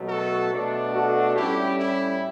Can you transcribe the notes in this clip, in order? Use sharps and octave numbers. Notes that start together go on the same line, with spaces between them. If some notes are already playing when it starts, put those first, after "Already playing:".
Already playing: B2 F#3 A3
F#4 A4
B2 A3 D4
F#4 A4
A2 G3 C#4 E4 G4
E4